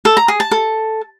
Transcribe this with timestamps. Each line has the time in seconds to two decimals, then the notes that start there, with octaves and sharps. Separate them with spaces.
0.05 A4
0.17 A#5
0.28 G#4
0.40 A5
0.51 A4